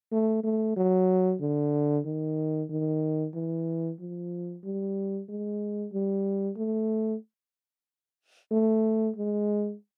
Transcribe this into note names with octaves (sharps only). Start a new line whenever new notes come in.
A3
A3
F#3
D3
D#3
D#3
E3
F3
G3
G#3
G3
A3
A3
G#3